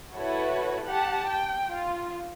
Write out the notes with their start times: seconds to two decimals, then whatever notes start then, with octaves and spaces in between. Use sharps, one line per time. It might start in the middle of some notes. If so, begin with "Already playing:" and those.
0.15 E4 F#4 A4 B4 C#5
0.86 G4 F#5 A5
1.29 G5
1.70 F4